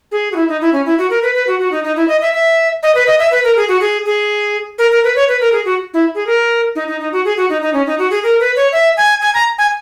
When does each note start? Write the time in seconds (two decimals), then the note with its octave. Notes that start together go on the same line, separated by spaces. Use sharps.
0.12 G#4
0.32 F#4
0.36 E4
0.49 D#4
0.61 E4
0.73 C#4
0.86 E4
0.98 F#4
1.10 A#4
1.22 B4
1.35 B4
1.47 F#4
1.60 F#4
1.71 D#4
1.84 D#4
1.96 E4
2.08 D#5
2.21 E5
2.33 E5
2.83 D#5
2.95 B4
3.07 D#5
3.19 E5
3.31 B4
3.44 A#4
3.56 G#4
3.69 F#4
3.80 G#4
4.06 G#4
4.78 A#4
4.91 A#4
5.04 B4
5.16 C#5
5.28 B4
5.41 A#4
5.52 G#4
5.65 F#4
5.94 E4
6.15 G#4
6.27 A#4
6.75 D#4
6.88 D#4
7.00 D#4
7.13 F#4
7.25 G#4
7.37 F#4
7.50 D#4
7.62 D#4
7.73 C#4
7.87 D#4
7.99 F#4
8.11 G#4
8.23 A#4
8.40 B4
8.56 C#5
8.72 E5
8.97 G#5
9.21 G#5
9.34 A#5
9.58 G#5